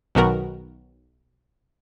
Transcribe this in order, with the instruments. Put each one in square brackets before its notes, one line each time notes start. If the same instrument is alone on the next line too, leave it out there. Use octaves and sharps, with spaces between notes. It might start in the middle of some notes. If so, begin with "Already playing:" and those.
[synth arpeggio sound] B1 D#3 B3 F#4 A#4